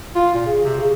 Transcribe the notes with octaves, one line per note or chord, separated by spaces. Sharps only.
F4
A#2
C#3
C3
C#3